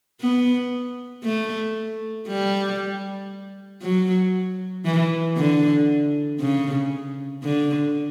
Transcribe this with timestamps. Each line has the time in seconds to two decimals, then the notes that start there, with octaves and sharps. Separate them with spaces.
0.21 B3
1.24 A3
2.28 G3
3.82 F#3
4.85 E3
5.37 D3
6.40 C#3
7.43 D3